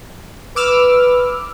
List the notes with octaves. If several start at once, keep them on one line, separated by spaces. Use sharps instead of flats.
B4 D6 E6 F6